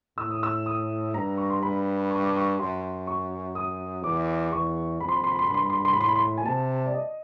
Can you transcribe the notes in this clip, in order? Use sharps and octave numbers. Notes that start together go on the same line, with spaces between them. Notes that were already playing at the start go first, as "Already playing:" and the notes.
A2 E6
D#6
E6
D#6
G2 A#5
C#6
C6
G2 B5
C#6
D6
C#6
F#2 C6
C#6
D#6
E2 D6
E2 C#6
F2 B5
C6
B5
C6
B5
C6
G2 B5
C6
B5
C6
B5
C6
B5
A2 C6
B5
C6
B5
G#5
C3 A5
D5
D#5